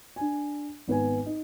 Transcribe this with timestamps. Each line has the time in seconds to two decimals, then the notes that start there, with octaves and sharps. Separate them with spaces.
0.16 D4 G#5
0.87 G#1 B3 B4 G#5
1.26 D#4